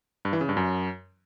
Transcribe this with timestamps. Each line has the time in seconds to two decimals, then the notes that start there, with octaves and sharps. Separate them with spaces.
0.25 G2
0.33 E3
0.41 C#3
0.49 G2
0.57 F#2